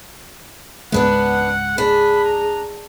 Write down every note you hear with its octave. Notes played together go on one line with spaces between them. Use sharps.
C#2 G#2 G#3 B3 D4 B4 F#5
D4 G#4 B5
A#5